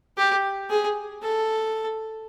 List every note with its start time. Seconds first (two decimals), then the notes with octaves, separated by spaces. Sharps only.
0.17 G4
0.70 G#4
1.22 A4